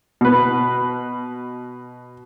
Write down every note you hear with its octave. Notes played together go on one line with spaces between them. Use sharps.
B2 B4